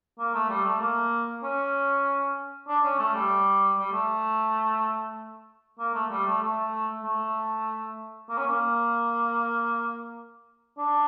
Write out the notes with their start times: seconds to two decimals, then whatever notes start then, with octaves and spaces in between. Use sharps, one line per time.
0.19 A#3
0.34 A3
0.49 G3
0.65 A3
0.81 A#3
1.43 C#4
2.68 D4
2.84 C#4
2.99 A3
3.14 G3
3.79 G3
3.92 A3
5.79 A#3
5.94 A3
6.11 G3
6.27 A3
6.42 A3
7.04 A3
8.29 A#3
8.38 C#4
8.47 A#3
10.78 D4